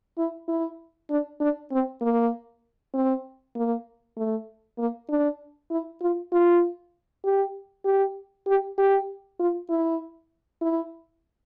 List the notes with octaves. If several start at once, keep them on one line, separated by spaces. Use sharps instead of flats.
E4
E4
D4
D4
C4
A#3
C4
A#3
A3
A#3
D4
E4
F4
F4
G4
G4
G4
G4
F4
E4
E4